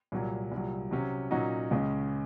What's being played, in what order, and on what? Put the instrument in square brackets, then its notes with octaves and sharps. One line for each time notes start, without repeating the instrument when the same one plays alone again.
[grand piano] C2 A#2 F#3
C2 A#2 F#3
C3 F#3 C#4
A#2 F#3 C#4 D#4 F#4
C#2 C#3 G#3 C#4